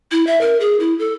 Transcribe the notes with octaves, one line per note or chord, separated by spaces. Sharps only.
E4
E5
A#4
G#4
E4
A4